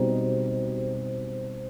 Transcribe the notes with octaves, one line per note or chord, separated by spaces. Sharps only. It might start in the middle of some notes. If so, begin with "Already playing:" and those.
Already playing: B2 G3 C4 D#4 C5